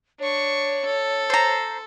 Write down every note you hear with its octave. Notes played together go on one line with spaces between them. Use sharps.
D4 C#5 C#6
A4
C5 A#5